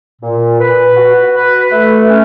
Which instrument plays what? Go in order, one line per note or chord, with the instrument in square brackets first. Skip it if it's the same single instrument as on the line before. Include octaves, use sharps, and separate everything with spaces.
[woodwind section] A#2
B4
F#4
B4
A3
C#4